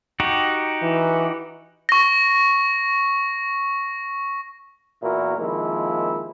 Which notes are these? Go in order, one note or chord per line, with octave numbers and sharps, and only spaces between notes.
D#4 F#4 G4
E3
C#6 A#6
E2 A#2 E3 E4 F#4 A#4
C3 D#3 F3 G#3 A#3 E4